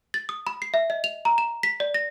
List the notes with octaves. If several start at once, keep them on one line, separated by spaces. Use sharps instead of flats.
A6
D#6
B5
C7
E5
D#5
F7
A#5
E7
B6
D5
A#6